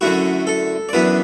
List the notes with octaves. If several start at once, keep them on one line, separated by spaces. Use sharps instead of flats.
F#2 D3 A3 E4 F#4
A4
D5
F#2 E3 B3 D4 B4